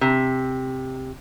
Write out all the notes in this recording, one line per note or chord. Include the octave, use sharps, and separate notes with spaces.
C3